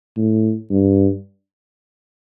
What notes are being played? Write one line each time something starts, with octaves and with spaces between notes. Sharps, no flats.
A2
G2